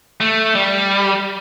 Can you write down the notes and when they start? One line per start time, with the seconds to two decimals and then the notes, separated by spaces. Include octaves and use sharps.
0.20 A3
0.55 G3